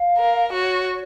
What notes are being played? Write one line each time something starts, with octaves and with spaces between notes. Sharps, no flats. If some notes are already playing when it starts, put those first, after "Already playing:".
Already playing: F5
A#4
D#5
F#4 C#5